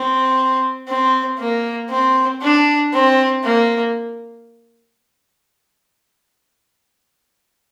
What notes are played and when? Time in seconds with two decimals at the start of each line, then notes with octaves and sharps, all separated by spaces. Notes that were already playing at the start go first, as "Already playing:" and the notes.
Already playing: C4
0.88 C4
1.39 A#3
1.90 C4
2.42 D4
2.93 C4
3.43 A#3